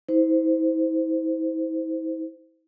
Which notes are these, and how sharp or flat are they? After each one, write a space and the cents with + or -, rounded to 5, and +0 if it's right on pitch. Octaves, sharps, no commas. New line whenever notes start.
E4 -40 C5 -15